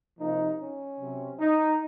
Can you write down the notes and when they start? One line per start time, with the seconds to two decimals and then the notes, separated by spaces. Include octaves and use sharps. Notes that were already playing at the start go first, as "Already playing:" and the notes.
0.19 C3 F3 A#3 D#4
0.60 C#4
1.00 C3 F#3 C4
1.40 D#4